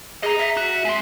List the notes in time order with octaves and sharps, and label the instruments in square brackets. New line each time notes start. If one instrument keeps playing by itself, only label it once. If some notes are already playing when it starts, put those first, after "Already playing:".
[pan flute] G#4 [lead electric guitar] D#5 A#5
[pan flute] E5
[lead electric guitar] F#4
G#3 C4